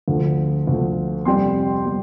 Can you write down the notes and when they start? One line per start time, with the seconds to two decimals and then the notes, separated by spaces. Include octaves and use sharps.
0.08 D2 D3 F3
0.67 D2 D3 F3
1.25 F2 C3 G3 G5 C6
1.85 C3 G3